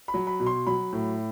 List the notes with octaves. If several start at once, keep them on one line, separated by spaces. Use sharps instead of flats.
B5
F#3
B5
B2
C6
F#3 B5
A2